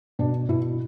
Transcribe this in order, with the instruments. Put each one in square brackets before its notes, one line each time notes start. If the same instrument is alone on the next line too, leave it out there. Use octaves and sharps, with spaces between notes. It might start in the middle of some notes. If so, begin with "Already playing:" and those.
[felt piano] B2 D4
B2 E4